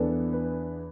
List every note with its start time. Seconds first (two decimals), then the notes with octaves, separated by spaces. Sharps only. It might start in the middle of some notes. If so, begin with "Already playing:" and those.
Already playing: E2 E3 B3 D4 A4
0.33 B4